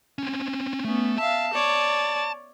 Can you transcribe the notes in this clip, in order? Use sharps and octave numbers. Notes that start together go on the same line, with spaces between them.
C4 C#4
A3 B3 C#4
E5 F5 A5
C#5 D5